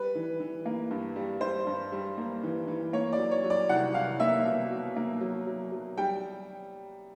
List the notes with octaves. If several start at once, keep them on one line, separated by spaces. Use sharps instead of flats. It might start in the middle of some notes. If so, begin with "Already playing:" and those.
Already playing: G3 B4
E3
E3
A#3
G2
G3
G3 C5
G2
G3
A#3
E3
E3
A#3 C#5
D5
F#3
C#5
F#3
D5
C2 F#5
C2 F5
A#3 E5
B2
F#3
A#3
F#3
F#3
F#3
G3 G5